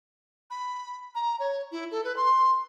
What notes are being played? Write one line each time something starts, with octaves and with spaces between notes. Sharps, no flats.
B5
A#5
C#5
E4
A4
B4
C6